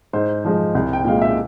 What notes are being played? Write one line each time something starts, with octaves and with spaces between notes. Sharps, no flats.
G#2 C5
F3 G#3
C2
G5
A#2 G#3 F5
E5